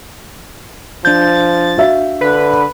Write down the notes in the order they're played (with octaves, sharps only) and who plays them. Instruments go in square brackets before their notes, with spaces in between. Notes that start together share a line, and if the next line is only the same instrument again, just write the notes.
[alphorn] F3 [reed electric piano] D4 G6 [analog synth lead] A6
[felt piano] F#4 E5 F5
[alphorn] D3 [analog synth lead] B4